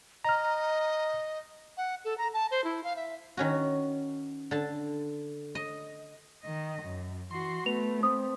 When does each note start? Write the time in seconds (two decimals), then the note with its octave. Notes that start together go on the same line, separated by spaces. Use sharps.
0.25 D#5 A#5 F6
1.77 F#5
2.05 A4
2.18 A#5
2.34 A5
2.51 C5
2.64 E4
2.84 F5
2.96 E5
3.37 D#3 C#4 F#4
4.51 D3 A5
5.55 D#5
6.43 D#3 D#5
6.82 F#2
7.31 E3 F#4 C6
7.66 A3 B3 F7
8.03 C4 D#6